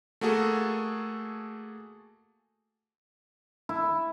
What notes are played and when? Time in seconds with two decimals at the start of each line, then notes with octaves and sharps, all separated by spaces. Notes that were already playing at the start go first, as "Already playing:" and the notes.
0.21 A3 A#3 F#4 G#4 A4
3.69 E4